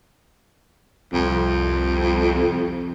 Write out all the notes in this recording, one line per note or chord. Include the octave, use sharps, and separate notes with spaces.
C2 F2